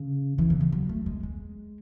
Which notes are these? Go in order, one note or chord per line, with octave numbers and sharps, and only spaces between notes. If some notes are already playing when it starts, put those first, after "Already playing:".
Already playing: C#3
E3
C#3
E3
F#3
A3
G#3
G#3